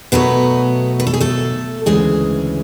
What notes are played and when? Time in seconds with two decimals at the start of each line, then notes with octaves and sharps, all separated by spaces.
0.12 B2 F#3 A3 B3 B4
1.00 B4
1.07 A4
1.14 G#4
1.20 A3 A4
1.86 D2 C#3 E3 G#3 G#4